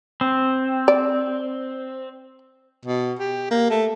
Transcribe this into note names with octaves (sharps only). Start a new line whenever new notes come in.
C4
D5
B2
G4
A#3
A3